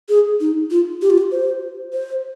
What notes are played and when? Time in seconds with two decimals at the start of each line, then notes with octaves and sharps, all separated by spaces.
0.09 G#4
0.40 D#4
0.71 F4
1.02 G4
1.10 F4
1.18 G4
1.31 C5
1.93 C5